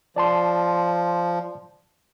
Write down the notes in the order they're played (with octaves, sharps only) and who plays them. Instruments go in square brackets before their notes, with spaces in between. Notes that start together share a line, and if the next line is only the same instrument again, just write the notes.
[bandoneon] F3 [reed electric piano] D5 A5 C6